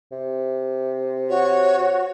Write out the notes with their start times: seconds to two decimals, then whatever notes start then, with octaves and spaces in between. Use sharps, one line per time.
0.11 C3
1.29 F#4 C#5